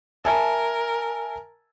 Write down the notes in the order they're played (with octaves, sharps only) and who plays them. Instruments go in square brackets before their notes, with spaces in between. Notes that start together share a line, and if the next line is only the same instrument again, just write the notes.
[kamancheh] A#4 [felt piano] E5 G#5 A5